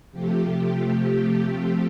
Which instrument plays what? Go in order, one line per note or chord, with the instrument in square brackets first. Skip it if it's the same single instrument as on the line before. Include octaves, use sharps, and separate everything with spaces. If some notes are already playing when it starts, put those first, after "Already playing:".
[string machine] C3 F3 A3 G4